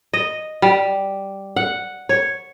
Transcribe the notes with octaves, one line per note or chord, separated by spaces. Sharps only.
D#5
G3
F#5
C#5